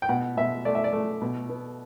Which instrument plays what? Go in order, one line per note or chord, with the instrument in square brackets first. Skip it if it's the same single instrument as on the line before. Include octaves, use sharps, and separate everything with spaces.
[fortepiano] G5
B2 F#5
B2 E5
A3 D5
E5
D5
A3
B2
B3